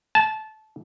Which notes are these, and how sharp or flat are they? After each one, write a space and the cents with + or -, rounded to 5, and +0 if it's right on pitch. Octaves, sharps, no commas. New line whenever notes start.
A5 -20